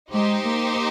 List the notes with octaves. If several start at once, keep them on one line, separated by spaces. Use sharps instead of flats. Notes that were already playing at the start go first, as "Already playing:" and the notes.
G#3 D#4 G4 C5
A#3